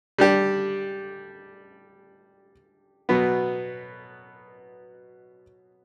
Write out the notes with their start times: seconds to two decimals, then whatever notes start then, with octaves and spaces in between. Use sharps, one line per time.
0.18 G3 D4 G4
3.09 B2 F#3 B3